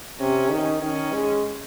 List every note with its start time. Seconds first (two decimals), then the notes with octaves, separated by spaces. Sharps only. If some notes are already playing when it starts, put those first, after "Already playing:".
0.19 C3 C#4
0.51 D#3
0.83 D#3 C#4
1.13 G#3